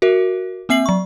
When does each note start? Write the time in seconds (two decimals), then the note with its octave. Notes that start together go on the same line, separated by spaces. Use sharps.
0.02 F#4 A#4 E5
0.69 A#3 C4 E5 C7 F#7
0.86 F#3 C#6